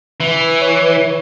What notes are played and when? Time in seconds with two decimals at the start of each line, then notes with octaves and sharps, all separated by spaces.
0.20 E3
0.61 C#5